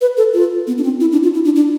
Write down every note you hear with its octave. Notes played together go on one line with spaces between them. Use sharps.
B4
A4
F4
B3
D4
C4
E4
D4
F4
E4
D4
D4